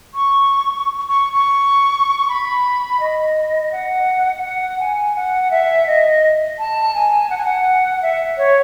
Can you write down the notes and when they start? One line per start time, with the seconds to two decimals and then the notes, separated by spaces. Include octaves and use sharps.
0.14 C#6
1.09 C#6
1.33 C#6
2.29 B5
3.00 D#5
3.72 F#5
4.44 F#5
4.80 G#5
5.16 F#5
5.51 E5
5.87 D#5
6.59 A5
6.95 G#5
7.30 F#5
7.38 G#5
7.45 F#5
8.02 E5
8.38 C#5